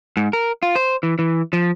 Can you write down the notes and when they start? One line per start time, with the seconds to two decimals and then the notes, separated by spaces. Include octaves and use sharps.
0.17 G#2
0.33 A#4
0.63 F4
0.76 C5
1.03 E3
1.19 E3
1.53 F3